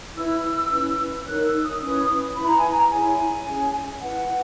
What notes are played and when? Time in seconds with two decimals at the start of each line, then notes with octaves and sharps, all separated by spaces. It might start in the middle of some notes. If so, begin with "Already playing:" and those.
0.15 E4 B4 E6
0.70 C#4 E4 B4
1.26 D#4 A#4 C#5 F#6
1.44 E6
1.63 D#6
1.81 C#4 E4 B4
2.36 E4 B4 B5
2.47 A#5
2.57 G#5
2.68 A#5
2.90 E4 G#4 C#5 G#5
3.46 C#4 G#4 C#5
4.01 E4 B4 F#5